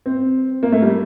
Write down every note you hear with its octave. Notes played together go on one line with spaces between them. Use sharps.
C4
A#3
A3
G3